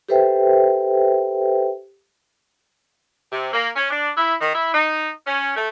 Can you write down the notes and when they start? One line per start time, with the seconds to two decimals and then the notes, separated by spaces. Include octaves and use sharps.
0.09 G4 A4 B4 C5 E5 G5
3.32 C3
3.53 A#3
3.76 C#4
3.90 D4
4.17 E4
4.41 D#3
4.54 E4
4.73 D#4
5.26 C#4
5.56 A3